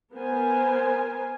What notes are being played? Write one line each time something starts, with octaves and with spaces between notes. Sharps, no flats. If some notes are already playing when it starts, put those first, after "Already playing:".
B3 A#4 C5 G#5